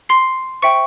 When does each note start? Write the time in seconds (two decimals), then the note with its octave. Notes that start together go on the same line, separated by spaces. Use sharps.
0.09 C6 C7
0.62 C5 E5 G5 C#6 C#7